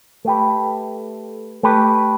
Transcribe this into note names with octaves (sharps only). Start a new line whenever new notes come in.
A3 G4 B4
A3 G4 B4